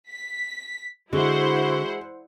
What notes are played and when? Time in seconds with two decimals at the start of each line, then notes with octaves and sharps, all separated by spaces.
0.10 B6
1.13 D3 G#3 E4 F#4 C5 F#5